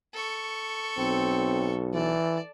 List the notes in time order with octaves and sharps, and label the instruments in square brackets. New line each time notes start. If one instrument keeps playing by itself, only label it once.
[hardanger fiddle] A4 C#6
[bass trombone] B1 [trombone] C4
[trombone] E3 [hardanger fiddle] D5 A5